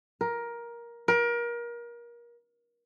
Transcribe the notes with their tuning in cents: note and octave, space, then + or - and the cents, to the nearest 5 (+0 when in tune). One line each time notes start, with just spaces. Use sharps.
A#4 +15
A#4 +30